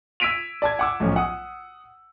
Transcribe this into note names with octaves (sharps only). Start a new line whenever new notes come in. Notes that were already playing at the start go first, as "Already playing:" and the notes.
E6 G#6 B6 D7 D#7 F7
D5 A5 G#6
F#5 D6 E6
B1 A2 F3 C#4
F#5 D#6